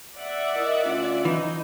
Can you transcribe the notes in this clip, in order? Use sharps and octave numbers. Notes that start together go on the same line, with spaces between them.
D5 E5 F#5
E4 A#4 D#5
D2 C#4 F4
E3 D#4